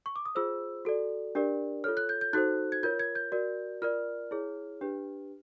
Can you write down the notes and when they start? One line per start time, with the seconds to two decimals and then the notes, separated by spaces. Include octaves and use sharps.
0.06 C#6
0.16 D6
0.26 D#6
0.35 F4 G#4 C5 E6
0.85 F#4 A4 D5
1.35 D4 G4 A#4 D5
1.84 F4 A4 C#5 F6
1.97 F#6
2.09 G6
2.21 G6
2.33 D#4 F#4 A4 C5 F#6
2.72 G#6
2.83 F4 A#4 C#5 G6
2.99 G#6
3.15 G6
3.32 F#4 A#4 D5
3.82 F4 A#4 D5 F6
4.31 E4 G#4 C#5
4.81 D4 G4 B4